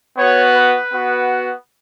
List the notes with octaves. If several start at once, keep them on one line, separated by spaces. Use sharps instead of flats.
B3 F#4 C#5
B4
B3 F#4